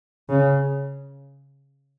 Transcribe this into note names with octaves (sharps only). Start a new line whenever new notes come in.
C#3